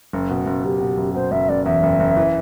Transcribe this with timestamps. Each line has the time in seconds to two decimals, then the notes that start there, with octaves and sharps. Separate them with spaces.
0.13 F#1
0.30 B2
0.47 F#1
0.64 F#1 G4
0.80 B2
0.97 F#1
1.14 B2 C5
1.31 F#1 E5
1.49 F#1 D5
1.66 E2 E5
1.83 F#1
2.00 F#1
2.17 E3